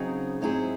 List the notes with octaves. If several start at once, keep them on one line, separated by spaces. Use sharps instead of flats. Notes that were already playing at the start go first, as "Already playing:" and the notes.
Already playing: C#3 F#3 C4 D#4 G#4
G#2 F#3 C4 E4 G#4